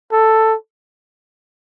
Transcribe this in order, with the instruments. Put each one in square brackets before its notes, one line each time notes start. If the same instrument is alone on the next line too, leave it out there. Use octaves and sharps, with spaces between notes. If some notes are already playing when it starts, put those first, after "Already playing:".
[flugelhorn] A4